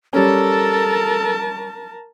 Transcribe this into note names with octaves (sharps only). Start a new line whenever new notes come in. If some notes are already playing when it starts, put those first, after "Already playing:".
G3 C#4 A4 A#4 A5